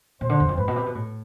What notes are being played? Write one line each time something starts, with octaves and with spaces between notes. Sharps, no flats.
B2 C5
D3
E2
F2
G#2 B4
B2
C3
B2
A2